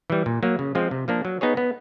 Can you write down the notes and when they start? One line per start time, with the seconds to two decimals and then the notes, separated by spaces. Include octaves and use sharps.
0.10 E3 G3
0.26 A#2
0.43 F#3 A#3
0.59 C#3
0.75 F3 G#3 C4 F4
0.91 C3
1.08 F3 A#3 D4
1.25 F#3
1.41 B3 D#4 G#4 C#5
1.57 B3